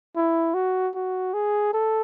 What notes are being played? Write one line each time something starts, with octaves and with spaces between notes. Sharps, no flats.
E4
F#4
F#4
G#4
A4